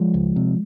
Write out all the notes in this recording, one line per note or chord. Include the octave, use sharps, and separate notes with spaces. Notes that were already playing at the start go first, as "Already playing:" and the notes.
Already playing: F3 G#3
C#2
C3